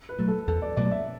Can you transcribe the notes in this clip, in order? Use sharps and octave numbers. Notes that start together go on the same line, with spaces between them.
B4
B2 F#3 A3
A4
E2 A4
D5
B2 F#3 A3 D5
E5